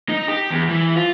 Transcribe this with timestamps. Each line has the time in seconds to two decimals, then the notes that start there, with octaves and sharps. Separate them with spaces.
0.09 D#4
0.28 G4
0.50 E2
0.69 E3
0.96 F4